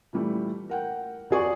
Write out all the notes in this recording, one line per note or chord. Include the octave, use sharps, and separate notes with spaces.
A#2 E3 G3 A3
A#4 F#5 G5
F2 F#4 G#4 D5 C#6